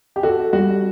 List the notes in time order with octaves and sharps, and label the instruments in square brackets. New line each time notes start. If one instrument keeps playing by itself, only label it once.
[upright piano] G4
[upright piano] F#4 [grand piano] A4
[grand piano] G3 [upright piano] F#4